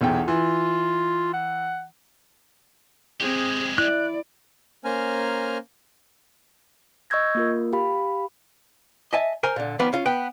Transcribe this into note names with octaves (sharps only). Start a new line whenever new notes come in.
B1 E2 G5
E3 F4
F#5
G#3 C4 G4 G#4
E4 D5 F#6
A#3 C#4 C5 G#5 A#5 F6
D#5 C#6 E6 G6 G#6 A#6
A#3 F4 A#4
G4 F5 B5
D#5 E5 G#5 A5
A#4 C5 G#5 A#5
A#2 D3
D#3 F3 B3 B4 D5
C#4 F4
B3 B4 G5